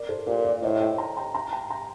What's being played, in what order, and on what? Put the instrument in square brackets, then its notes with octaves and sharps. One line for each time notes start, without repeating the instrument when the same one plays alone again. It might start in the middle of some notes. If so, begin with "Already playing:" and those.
Already playing: [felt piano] A#4 D5
A4 C5
[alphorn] A#2 [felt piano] G4 A#4
[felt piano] A#4 D5
[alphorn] A2 [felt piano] C5 D#5
[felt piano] D#5 G5
G5 A#5
G5 A#5
G5 A#5
G5 A#5
G5 A#5